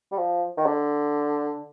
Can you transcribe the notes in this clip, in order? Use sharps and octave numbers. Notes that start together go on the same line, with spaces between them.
G3
F3
D#3
D3